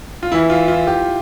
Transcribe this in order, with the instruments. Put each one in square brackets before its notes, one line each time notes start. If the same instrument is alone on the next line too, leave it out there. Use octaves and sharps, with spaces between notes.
[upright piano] F4
[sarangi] E3 [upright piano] E4
[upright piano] F4
F4
G4